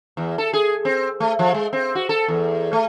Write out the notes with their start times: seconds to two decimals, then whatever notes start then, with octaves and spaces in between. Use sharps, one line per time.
0.17 E2
0.38 A4
0.53 G#4
0.85 C4
1.20 A3
1.39 F3
1.54 G#3
1.73 C4
1.95 F#4
2.09 A4
2.28 E2
2.73 A3